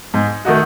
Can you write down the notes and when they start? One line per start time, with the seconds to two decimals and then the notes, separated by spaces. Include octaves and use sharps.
0.14 G#2
0.45 D#3 A3 D#4 F#4